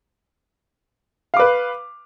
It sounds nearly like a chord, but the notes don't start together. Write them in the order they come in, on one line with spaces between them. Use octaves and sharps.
F5 D6 B4